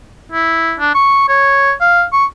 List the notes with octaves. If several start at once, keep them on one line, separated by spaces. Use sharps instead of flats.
E4
D4
C#6
C#5
F5
C#6